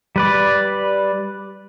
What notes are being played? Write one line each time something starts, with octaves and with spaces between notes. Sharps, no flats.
G3 B4 D5